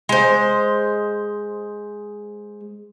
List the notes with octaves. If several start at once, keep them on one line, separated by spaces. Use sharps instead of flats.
G#3 C5